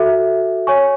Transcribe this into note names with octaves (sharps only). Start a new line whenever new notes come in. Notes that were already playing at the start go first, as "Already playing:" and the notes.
Already playing: F#4 A4 E5
C#5 G#5 C#6